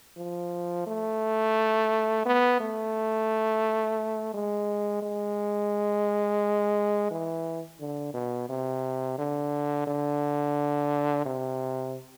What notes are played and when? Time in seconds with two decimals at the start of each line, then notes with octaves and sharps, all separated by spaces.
0.17 F3
0.87 A3
2.26 B3
2.60 A3
4.34 G#3
5.02 G#3
7.11 E3
7.80 D3
8.14 B2
8.49 C3
9.18 D3
9.87 D3
11.26 C3